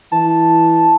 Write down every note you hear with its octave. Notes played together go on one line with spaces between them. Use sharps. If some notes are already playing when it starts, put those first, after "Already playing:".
E3 A5